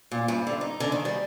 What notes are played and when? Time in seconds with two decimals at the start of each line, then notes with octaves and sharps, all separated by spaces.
0.12 A#2
0.28 G2
0.47 D3
0.61 D#4
0.80 D3
0.92 D#3
1.05 G3